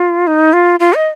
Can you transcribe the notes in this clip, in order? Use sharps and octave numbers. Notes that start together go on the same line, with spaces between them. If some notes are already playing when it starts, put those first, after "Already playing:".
Already playing: F4
D#4
F4
F4
D#5